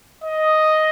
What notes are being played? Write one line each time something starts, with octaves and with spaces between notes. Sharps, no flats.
D#5